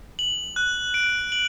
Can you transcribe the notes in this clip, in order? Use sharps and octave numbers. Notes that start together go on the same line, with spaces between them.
F#7
F#6
D7
F#7